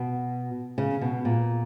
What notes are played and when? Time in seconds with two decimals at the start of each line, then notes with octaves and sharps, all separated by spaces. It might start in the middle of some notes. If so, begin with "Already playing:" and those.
Already playing: B2
0.78 C#3
1.01 B2
1.25 A#2